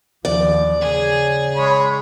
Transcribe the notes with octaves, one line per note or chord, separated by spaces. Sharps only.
D#2 F3 D5
C#3 G#4
G#3 C#5 B5